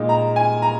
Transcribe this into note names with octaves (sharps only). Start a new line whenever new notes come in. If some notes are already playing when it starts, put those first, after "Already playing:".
Already playing: A#2 G#3 D#4
A#5
G#5
A#5